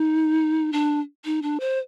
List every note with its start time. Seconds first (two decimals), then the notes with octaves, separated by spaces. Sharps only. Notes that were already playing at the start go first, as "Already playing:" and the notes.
Already playing: D#4
0.73 D4
1.25 D#4
1.42 D4
1.60 C5